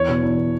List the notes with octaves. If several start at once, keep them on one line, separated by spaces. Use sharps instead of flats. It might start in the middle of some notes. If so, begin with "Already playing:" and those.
Already playing: E2 C#5
B2
E2
B2